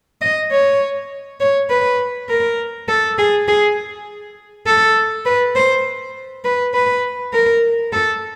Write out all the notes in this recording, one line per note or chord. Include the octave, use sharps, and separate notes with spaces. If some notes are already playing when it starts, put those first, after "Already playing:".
D#5
C#5
C#5
B4
A#4
A4
G#4
G#4
A4
B4
C5
B4
B4
A#4
A4